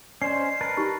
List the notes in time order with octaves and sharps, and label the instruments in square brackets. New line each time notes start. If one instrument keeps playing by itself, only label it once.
[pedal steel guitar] C#4 C5 [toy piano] D5 D#5 [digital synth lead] C7
[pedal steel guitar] A#4 B4 A5
[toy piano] D#4 G4 C#6